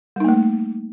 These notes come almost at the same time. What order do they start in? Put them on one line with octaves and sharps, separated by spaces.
G3 D#4 A#3 A3